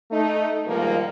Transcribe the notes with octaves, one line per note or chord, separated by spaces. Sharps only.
A3 D#4
B2 D#3 F3 G3 G#3 A#3